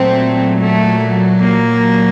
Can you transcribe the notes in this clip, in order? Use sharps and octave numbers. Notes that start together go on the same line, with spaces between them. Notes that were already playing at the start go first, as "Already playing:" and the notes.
Already playing: A#2 F#3 A3 C4
A3
A#3